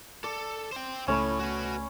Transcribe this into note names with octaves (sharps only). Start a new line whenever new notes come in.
A4 D5
C5 G5
C#2 A2 A3 C#4 C#5 B5
F#4 B4